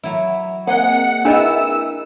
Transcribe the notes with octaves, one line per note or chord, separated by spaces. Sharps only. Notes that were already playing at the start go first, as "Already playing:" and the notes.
F#3 E4
A#3 C4 G#4 D#5 F#5
D4 E4 G#4 A#4 B4 D#5 E5 E6